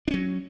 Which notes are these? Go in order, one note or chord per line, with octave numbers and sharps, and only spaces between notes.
F#3 C#4 D4